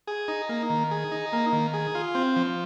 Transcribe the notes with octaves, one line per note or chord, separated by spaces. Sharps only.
G#4
D#4
A#3
D#3
G#4
D#4
A#3
D#3
G#4
F4
C4
F3